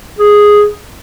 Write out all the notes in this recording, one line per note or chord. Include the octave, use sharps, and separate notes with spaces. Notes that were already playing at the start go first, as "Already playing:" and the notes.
G#4